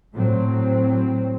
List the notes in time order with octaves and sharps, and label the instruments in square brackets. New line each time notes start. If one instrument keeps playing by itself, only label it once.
[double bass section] A2 F#3 C4